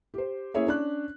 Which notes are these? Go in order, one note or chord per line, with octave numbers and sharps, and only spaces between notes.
G4 C5
A#3 C#4 E4 G#4 C#5 E5
C#4 D4 F#6